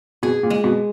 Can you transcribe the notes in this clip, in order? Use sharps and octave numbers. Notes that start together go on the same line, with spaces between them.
B2 G#4
A#2
G#3
B2